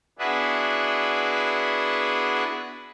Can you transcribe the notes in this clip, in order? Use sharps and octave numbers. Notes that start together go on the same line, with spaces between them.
B3 D4 E4 F#4 G#4 B4